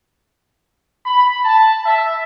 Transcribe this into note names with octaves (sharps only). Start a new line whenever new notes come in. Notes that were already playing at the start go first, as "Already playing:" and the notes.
B5
A5
E5